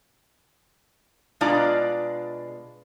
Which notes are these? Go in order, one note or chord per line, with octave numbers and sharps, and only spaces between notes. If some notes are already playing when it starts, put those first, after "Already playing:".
B2 G#3 D4 F4 D5 A#5